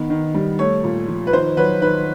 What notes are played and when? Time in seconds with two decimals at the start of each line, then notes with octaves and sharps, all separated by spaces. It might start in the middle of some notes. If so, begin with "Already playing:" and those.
Already playing: D#3 B3
0.10 D#3
0.35 G3
0.59 A3 C#5
0.84 A#2
1.08 F3
1.27 B4
1.33 D#3 C5
1.57 F#3 B4
1.81 D#3 B4